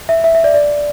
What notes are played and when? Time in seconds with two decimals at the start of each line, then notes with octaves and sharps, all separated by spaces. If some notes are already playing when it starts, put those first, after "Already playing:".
0.09 E5
0.24 E5
0.35 E5
0.44 D5
0.54 D5